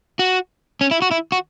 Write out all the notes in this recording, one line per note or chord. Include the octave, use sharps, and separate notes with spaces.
F#4
C#4
E4
F#4
E4
F#4